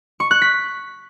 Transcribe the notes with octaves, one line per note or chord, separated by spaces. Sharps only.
C#6
F#6
B6